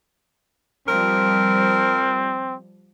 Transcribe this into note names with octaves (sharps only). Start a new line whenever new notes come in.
F3 G3 C4 A#4